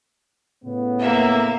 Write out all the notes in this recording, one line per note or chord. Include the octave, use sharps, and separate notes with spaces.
A2 C#3 B3
A#3 E5